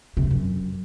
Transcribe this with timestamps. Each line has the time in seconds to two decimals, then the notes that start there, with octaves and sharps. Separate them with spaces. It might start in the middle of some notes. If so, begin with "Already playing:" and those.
0.17 C3
0.24 G#2
0.31 F#2